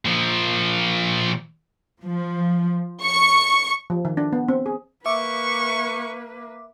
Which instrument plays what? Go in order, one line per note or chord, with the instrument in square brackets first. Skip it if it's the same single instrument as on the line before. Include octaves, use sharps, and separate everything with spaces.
[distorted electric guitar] A#2 F3
[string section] F3
C#6
[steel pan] F3
D#3
D4
B3
C4
G#4
[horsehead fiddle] A#3 B4 [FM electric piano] E5 D6 [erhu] C#6